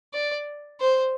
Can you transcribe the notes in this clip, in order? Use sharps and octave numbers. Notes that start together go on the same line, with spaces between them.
D5
C5